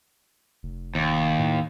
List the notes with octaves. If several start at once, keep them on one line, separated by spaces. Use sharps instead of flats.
F1
D#2
A2